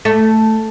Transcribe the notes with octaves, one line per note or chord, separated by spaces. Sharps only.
A3